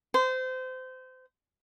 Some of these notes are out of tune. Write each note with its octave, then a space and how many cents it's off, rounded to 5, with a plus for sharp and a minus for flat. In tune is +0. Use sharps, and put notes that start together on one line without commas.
C5 -25